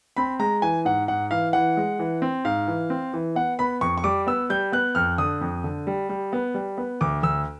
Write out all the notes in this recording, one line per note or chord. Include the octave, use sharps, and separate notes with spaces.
C4 B5
G#3 A#5
E3 G#5
G#2 F#5
G#2 F#5
E3 F5
E3 F#5
G#3
E3
C4
G#2 F5
E3
C4
E3
B3 F#5
B3 B5
F2 C#6
C#6
G3 D6
B3 E6
G3 G6
B3 F#6
F2 F6
D3 D#6
F2
D3
G3
G3
B3
G3
B3
D2 D6
D2 E6